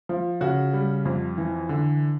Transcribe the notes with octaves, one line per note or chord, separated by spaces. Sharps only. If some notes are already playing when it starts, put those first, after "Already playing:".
F3
C#3 F#4
G3
F2
E3
D3